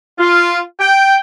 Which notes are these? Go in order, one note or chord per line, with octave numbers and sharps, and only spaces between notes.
F4
G5